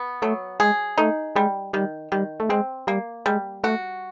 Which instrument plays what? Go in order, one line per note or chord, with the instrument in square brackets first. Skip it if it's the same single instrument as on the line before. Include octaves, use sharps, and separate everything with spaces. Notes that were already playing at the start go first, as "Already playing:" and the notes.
Already playing: [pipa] B3
[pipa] F#3 [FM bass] A3
[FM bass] G#3 [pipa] G#4
[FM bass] A3 [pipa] D#4
[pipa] G3 [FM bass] G#3
[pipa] D#3 [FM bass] G3
[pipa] D#3 [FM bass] G3
[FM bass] A3
[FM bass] G#3 [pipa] C4
[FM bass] G3 [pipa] A#3
[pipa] G3 [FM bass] G#3
[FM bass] A3 [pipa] F#4